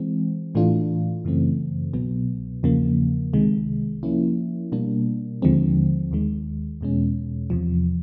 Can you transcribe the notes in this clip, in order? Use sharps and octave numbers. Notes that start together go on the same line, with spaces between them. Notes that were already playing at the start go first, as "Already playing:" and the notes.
Already playing: E3 G#3 C4
A2 E3 A3 D4 F4
F#2 C#3 E3 A3 C4
C2 B2 F#3 B3
E2 C#3 F3 A#3
C2 C3 D#3 G#3
F3 A#3 C#4 E4
B2 G3 A#3 D4
D#2 D3 F3 G#3 C4
D#2 D#3 G#3
E2 B2 G#3 C#4
E2 C3 F3